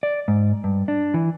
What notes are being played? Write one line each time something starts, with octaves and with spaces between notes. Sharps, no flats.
D5
G#2
G2
D4
E3